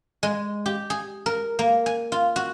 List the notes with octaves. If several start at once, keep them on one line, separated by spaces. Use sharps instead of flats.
G#3
G4
G#4
A#4
A#3
G#5
F4
F#4